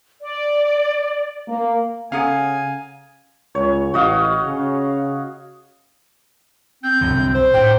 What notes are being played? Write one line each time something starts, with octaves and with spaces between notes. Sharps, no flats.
D5
A#3
C#3 C#4 A4 F5 F#5 G#5 A#5 D#6
C#2 C#5
A1 F#4 D#5 F5
C#3
C4 G6
C2 F#2 D3
C5
A2 G5